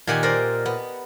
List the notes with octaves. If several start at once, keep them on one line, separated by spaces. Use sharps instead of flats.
A#2 D#3 G4 F#5 G#5
A#4 C5 D5 D#5
B3